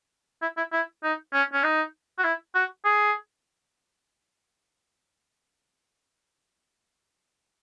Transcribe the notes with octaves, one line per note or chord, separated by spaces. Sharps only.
E4
E4
E4
D#4
C#4
C#4
D#4
F#4
E4
F#4
G#4